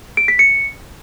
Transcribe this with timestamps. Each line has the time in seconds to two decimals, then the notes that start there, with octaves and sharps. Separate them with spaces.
0.17 D7
0.28 B6
0.39 C#7